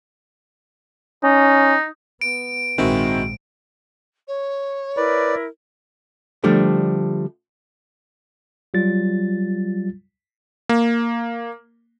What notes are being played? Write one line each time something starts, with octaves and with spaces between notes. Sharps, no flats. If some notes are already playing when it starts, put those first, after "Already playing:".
C#4 D#4
B3 D7
A#1 G#2 D#3 G#3 C4 E4 F#4
C#5
E4 A#4 B4 D5
D3 F3 G3 A3 D4
F#3 G3 F4 A6
A#3